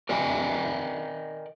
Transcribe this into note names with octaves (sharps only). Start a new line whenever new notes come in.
A#4 D5 D#5 G5 G#5